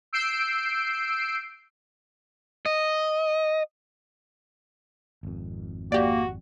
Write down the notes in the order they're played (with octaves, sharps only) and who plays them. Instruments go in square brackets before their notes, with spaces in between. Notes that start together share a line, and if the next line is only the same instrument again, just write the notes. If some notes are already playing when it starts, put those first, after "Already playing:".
[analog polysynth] E6 G6 C7 D7
[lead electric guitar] D#5
[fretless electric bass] G#1 F2
[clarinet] A#3 [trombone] F#4 [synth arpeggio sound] G4 D5